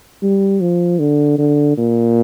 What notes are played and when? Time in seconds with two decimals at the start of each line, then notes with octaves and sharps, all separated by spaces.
0.22 G3
0.61 F3
0.99 D3
1.38 D3
1.78 A#2